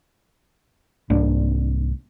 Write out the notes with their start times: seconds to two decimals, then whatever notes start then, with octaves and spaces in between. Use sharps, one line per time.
1.10 C2 G#2 A#3 D4